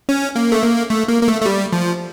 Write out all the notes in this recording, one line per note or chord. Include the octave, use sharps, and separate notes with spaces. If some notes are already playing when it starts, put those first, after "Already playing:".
C#4
A#3
A3
A#3
A3
A#3
A#3
A3
A3
G3
F3